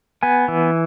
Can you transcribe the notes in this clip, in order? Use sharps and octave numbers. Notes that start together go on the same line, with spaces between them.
B3 G#5
E3